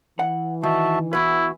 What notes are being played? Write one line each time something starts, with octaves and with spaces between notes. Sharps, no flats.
E3 F#5
D#3 F#4 E5 A5
E2 E4 F#4 B4